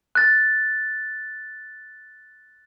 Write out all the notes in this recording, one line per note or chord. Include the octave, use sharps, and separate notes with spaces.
F#6 A6